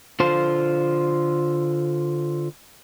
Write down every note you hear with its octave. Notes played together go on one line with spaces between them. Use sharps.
D3 F4 C5